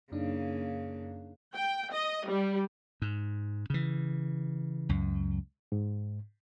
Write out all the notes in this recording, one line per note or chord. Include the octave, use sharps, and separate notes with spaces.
F#2 C#3 A#3 D4 D#4
G5
D#5
G3
G#2
C#3 E3
C#2 F#2
G#2